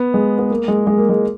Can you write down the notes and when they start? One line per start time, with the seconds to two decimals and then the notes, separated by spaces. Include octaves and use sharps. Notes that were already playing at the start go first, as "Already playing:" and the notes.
Already playing: B3
0.14 G#3
0.39 B3
0.50 A#3
0.68 G#3
0.87 G#3
0.98 A#3
1.09 G#3